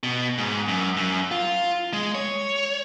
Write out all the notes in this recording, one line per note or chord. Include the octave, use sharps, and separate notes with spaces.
B2
G#2
F#2
F#2
F4
G#3
C#5